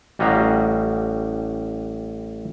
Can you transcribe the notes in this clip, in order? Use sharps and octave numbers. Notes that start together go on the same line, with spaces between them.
A1 G3 F#4 D#5 F5 A#5